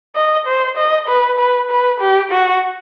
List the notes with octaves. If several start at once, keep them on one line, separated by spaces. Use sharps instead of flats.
D#5
C5
D#5
B4
B4
B4
G4
F#4